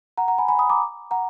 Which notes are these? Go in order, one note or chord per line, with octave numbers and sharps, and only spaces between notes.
F#5 A#5
F#5 A#5
G#5 B5
G#5 B5
B5 D#6
A#5 D6
F#5 A#5